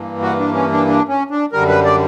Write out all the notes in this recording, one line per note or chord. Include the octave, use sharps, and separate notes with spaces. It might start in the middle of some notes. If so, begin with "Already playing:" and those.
Already playing: G2 E3 A#3
F#4
D4
C#4
D4
D4
C#4
D4
F#2 D3 G3 A#4
B4
D5